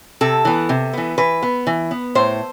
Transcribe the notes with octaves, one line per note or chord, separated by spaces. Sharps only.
C3 A4
E3 B3
C3
E3 B3
E3 B4
B3
E3
B3
A2 C5